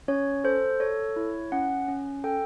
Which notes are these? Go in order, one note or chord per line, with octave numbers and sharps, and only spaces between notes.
C#4 C#5
A4 C5
A4 C#5
E4
C#4 F#5
C#4
A4 G5